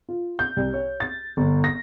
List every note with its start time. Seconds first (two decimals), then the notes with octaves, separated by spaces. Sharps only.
0.09 F4
0.39 G6
0.57 C2
0.74 C#5
1.00 A6
1.37 G1
1.64 A#6